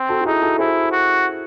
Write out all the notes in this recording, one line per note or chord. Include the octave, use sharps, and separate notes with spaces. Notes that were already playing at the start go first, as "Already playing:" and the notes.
Already playing: C4
F#4 A4
F#4
D#4 E4 G#4
F#4 A4
E4 G#4 C5
F#4